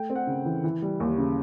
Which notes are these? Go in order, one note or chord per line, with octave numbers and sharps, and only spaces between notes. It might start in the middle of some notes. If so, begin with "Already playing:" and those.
Already playing: A3 G5
C4
F#5
C#3
E3
E3
G3
D#2
C#3